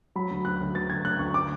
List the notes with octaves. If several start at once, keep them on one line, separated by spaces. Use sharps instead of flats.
F#3 B5
D2
D2 F#6
D2
D2 A6
D2 G#6
D2 F#6
D2 C#6
D6